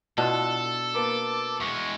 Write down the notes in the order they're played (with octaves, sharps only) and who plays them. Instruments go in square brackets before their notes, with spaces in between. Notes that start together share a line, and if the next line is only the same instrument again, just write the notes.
[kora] B2 D4 [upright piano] E4 F4 C6 [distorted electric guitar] A4
[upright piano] A#3 B4 A5 [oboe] D6
[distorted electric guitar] E2 G#3 [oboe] C#6